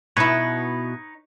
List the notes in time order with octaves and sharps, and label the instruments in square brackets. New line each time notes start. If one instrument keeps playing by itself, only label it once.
[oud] B2 E4 [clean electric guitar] D#4 B4 C#5